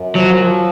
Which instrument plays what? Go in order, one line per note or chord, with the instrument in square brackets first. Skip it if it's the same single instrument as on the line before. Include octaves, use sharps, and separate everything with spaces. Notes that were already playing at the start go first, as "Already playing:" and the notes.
Already playing: [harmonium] F#2
[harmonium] F3 [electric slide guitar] F#3
[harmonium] F3